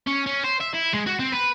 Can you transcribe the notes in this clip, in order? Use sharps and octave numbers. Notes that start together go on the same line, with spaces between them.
C#4
C#4
C5
E5
E4
G#3
F#4
C4
B4